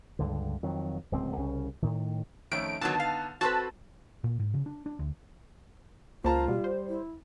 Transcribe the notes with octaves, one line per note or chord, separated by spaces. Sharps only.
C#2 G2 D3
F2 D#3 F#3
D1 C#2 C4
C2 C#3 C#4
A2 D#3
F2 D#3 A3 C#4 D7
A#2 D3 D#3 F#3 B3 D#4 A5
F5
C4 F#4 A4 B4 A5 C6
A#2
G#2
C#3
D4
D4
D2
C#2 A#3 F4 C5 A5 A#5
B2 G3
C5
E4